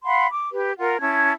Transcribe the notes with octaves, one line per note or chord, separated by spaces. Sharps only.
F5 F#5 B5 C6
D6
G4 B4
F4 A#4 F#5
C#4 E4 A5 G#6